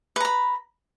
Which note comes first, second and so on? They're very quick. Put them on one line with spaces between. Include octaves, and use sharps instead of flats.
B4 A#5 B5